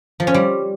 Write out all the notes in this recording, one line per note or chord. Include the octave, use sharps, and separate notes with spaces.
F3
C#4
G3